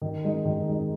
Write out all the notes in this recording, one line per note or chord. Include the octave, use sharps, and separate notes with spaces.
D#3
G#3 D#4
D#3
G#3 D#4